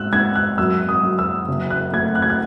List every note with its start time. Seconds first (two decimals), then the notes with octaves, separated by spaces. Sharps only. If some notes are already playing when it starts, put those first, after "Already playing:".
Already playing: G#2 E6 F#6
0.12 G#2 G#6
0.35 F#6
0.58 F#2 E6
0.89 D#6
1.03 F#2
1.19 E6
1.48 F#1
1.70 F#6
1.93 A3 G#6
2.15 F#6
2.22 G#6
2.30 F#6